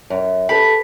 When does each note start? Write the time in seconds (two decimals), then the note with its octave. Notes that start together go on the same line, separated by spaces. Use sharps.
0.10 F#2
0.49 G4 A4 B4 B5